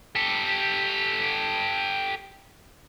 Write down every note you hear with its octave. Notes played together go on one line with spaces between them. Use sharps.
G4 A4